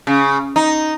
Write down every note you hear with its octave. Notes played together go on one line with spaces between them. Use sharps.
C#3
D#4